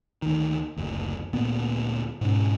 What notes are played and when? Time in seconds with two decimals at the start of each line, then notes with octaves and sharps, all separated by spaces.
0.22 D2 D#3
0.77 F#1 D2
1.33 D2 A#2 B3
2.21 G#2 B2 C#4